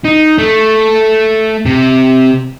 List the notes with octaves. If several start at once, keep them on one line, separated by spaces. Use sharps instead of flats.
D#4
A3
C3